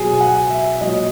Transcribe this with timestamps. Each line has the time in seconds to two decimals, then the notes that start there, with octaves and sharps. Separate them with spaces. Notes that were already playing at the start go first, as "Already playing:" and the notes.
Already playing: B2 F#3 G#4
0.13 G#5
0.21 F#5
0.50 E5
0.81 A#2 F#3 D#5